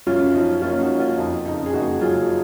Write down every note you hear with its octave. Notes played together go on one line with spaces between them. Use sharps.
F#2 C#4 F4
F3 D#4
F#1 C#4 F4
D#4 F#4
F#1
C#4 F4
F2 D#4
C#3 D#4
G#4
F#1 D#4 F#4
F#3 F4 G#4